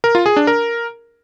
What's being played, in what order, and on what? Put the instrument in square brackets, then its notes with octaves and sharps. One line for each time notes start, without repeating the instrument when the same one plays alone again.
[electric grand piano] A#4
F4
G#4
D4
A#4